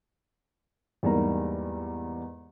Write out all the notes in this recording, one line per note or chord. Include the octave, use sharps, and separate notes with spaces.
E2 G#2 G3 A#3 A#5